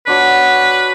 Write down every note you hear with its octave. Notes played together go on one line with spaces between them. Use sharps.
D4 F#4 B4 C#5